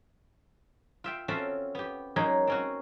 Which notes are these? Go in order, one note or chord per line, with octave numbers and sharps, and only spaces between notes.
F4 E5 G5
C4 C#4 F4 F#4 A4 E5
B3 G4
F#3 G#3 A#3 C#4 D#4 C#5
C4 C#4 F#4